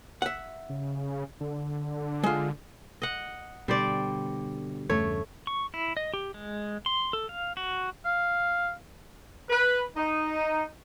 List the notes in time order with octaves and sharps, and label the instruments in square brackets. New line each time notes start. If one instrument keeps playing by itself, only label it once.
[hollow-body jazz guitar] E5 F#5
[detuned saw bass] C#3
D3
[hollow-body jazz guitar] G#3 F4
[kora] D#5 F#5
[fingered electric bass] B2 D3 [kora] G3 C5 D5
[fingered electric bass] E2 G2 C#3 [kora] A3 C#5
[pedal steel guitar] C#6
E4
D#5
G4
G#3
C6
A4
F5
F#4
[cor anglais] F5
[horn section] B4
D#4